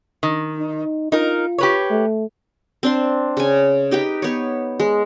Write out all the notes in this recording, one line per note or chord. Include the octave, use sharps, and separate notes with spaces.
D#3
D#4
D#4 F4 A#4
G4 B4 C#5
A3
C4 D4 C6
C#3 G#5
D#4 G4 B4 G5
B3 C#5
G#3